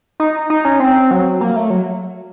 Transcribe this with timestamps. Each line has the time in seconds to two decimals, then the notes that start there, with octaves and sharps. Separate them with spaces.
0.20 D#4
0.50 D#4
0.65 C#4
0.80 C4
1.11 F#3
1.41 A#3
1.56 A3
1.70 F#3